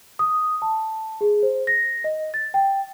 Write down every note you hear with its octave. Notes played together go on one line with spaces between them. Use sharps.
D#6
A5
G#4
C5
A#6
D#5
A6
G5